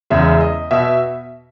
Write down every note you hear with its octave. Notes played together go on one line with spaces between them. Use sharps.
E2 C#3 G#3 E5
D#5
B2 E5